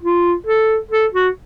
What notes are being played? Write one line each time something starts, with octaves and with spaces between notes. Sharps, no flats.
F4
A4
A4
F#4